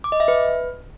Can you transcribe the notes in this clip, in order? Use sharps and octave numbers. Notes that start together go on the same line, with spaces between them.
D6
D#5
E5
B4